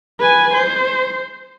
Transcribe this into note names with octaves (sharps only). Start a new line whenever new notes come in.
B4 G#5
C5